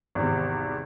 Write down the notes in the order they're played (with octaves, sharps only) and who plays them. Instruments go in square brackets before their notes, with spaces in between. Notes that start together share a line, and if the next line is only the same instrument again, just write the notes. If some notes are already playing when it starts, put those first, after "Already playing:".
[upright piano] G#1 E2 C3